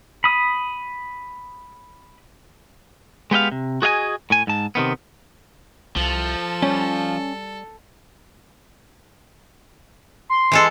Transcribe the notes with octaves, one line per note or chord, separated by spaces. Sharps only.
B5 D#6
G#3 B3 G4 D#5 F5
C3
F#4 G#4 D#5 F5 G#5
A2 G#5
G#2 A5
C3 D#3 B3
C2 F3 A4
G3 C#4
C6
E3 G#3 A4